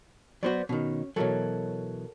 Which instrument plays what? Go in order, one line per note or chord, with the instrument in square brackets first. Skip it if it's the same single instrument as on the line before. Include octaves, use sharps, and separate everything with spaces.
[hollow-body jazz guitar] F#3 B3 F#4 [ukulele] B4 C5 D5
[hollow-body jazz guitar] B2 D#3 [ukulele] C#4
[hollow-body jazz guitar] B2 E3 F#3 [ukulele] A4 A#4 C#5